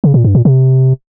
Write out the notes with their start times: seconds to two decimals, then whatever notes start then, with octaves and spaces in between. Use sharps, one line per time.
0.04 C#3
0.14 A#2
0.24 G2
0.35 A#2
0.45 C3